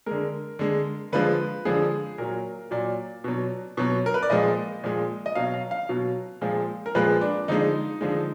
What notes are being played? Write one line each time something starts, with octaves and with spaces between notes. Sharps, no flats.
D3 G#3 A#4
D3 G#3
D3 F3 G#3 B4
D3 F3 G#3 G#4
A#2 F#3 A#4
A#2 F#3 D5
B2 F#3
B2 F#3
A#4
B4
D5
A#2 F3 G#3 D#5
A#2 F3 G#3
D#5
B2 F#3 F5
F5
F5
B2 F#3
A#2 F3 G#3
A#4
A#2 F3 G#3 B4
D4
D3 F3 G#3 D#4
D3 F3 G#3